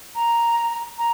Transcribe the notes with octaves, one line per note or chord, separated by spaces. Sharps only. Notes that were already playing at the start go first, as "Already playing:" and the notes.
A#5
A#5